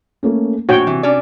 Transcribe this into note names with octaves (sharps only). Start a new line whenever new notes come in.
A3 A#3 C#4
A#1 A2 F#4 C#5 G5
C3 E3
C#4 D4 D5